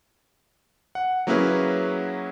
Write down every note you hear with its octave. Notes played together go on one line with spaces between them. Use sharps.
F#5
F#3 A#3 C#4 E4 G#4 B4